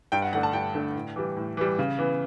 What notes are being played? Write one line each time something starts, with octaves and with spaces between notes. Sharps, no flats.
G2 G5
F#5
D3 A3 D4 F#5
A5
G2 G5
D3 A3 D4
A2
E3 G3
A2
E3 G3
C#3
E3 B3